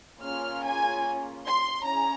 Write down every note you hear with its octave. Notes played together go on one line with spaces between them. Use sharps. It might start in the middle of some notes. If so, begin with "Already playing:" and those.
A#3 C#4 F4 G#4 F6
G#5
C6
C#4 E4 G#4 A#5